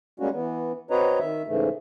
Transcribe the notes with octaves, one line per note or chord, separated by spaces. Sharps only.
G3 G#3 A#3 C#4 F#4
E3 B3
C4 F#4 B4 C#5 D#5 A#5
D#3 E5
G#2 C#3 E3 A3